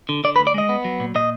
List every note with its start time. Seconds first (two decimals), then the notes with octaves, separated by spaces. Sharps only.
0.09 D3
0.24 D3 D5
0.36 B4
0.39 D2
0.47 D5
0.54 G#3 D#5
0.69 B3
0.85 F#3
1.00 A#2
1.15 A#2 D#5